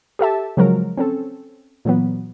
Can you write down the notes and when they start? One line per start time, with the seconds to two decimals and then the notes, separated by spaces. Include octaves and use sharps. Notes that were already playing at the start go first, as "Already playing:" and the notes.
0.19 G4 A4 E5 A5
0.57 C#3 F3 F#3 G#3 A#4
0.97 C4 C#4 A4
1.85 A#2 E3 F#3 B3